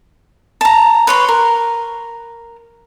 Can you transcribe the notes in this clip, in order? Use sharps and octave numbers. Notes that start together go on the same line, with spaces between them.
A5 A#5
B4 C#5 C6
A#4